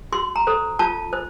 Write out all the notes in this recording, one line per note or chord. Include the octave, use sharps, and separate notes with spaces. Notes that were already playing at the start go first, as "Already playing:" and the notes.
F#4 C6
A#5
A4 C5
F4 A5
C5